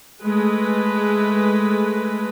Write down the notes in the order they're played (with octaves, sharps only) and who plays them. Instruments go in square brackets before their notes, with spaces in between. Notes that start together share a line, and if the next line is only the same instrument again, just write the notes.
[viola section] G#3 A3 B4